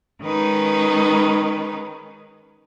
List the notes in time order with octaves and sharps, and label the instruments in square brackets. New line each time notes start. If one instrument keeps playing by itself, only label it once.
[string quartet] D#3 G#3 C#4 D#4 B4